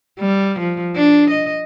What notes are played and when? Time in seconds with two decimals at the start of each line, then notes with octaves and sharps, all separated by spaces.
0.20 G3
0.60 F3
0.96 D4
1.31 D#5